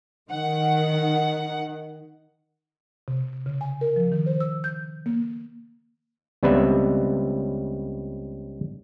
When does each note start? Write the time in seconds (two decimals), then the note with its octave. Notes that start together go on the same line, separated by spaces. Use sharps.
0.30 D#3 F#5
3.08 C3
3.46 C#3
3.61 G#5
3.81 A#4
3.96 F3
4.12 D#3
4.26 C5
4.40 E6
4.64 G6
5.06 A#3
6.43 C#2 G3 B3 C4 B4 E5